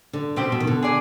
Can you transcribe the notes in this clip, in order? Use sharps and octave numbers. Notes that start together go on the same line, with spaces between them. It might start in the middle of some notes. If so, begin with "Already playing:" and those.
D3
B2 C4 G4 C5
B2
D#3
D3
G#4 D5 G#5